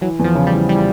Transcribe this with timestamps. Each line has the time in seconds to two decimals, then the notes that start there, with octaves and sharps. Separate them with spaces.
0.01 E3 F#3
0.19 E2
0.24 F3
0.35 C#3
0.47 G3
0.52 E3
0.69 E3 G3